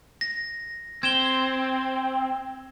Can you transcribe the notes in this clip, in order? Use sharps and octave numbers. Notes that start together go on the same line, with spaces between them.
A#6
C4 G#6 E7 G7